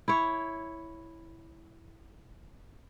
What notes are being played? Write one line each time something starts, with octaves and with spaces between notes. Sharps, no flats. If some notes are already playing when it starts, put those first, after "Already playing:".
E4 C#5